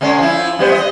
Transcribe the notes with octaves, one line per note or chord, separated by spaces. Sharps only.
D3 G#3 C#4
F3 E4
G3 B3 C5
D#5